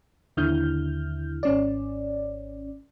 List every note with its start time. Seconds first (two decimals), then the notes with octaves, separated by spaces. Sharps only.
0.37 D#2 D3 E4 F6 G6
1.43 G#1 C#4 D5